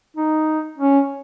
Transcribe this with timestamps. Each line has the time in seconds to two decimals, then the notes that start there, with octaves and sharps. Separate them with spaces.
0.17 D#4
0.78 C#4